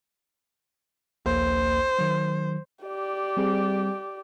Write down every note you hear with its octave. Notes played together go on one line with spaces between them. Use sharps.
A#1 D#2 A#3 C5
D#3 F#3
G4 D5
G3 C4 G#4